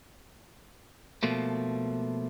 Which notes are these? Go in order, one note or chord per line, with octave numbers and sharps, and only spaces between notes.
B2 F3 A3 A#3